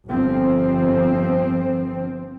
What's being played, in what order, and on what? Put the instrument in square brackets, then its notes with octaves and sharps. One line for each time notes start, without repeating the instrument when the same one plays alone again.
[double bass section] G1 F3 C4